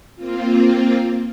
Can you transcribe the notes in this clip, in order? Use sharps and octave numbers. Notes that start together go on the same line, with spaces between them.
A#3 C4 F4